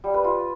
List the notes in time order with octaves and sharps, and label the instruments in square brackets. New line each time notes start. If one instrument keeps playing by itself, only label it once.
[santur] G3
B4
F4